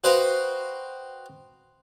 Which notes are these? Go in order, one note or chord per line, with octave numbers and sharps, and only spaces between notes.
F#4 B4 C5 D#5 F5 G5